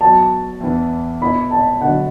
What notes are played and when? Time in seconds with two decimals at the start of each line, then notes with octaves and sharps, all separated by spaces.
0.01 F#3 B3 F#4 A5
0.60 E2 E3 B3
1.21 B2 B3 E4 B5
1.51 A5
1.81 D3 F#3 B3 F#4 F#5